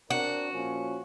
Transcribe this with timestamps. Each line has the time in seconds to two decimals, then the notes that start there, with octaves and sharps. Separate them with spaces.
0.10 C4 D4 F#4 A#4
0.53 A#2 F3 C#4